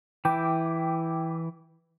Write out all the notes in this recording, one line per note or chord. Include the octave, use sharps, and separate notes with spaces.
E3 E4 G5 D6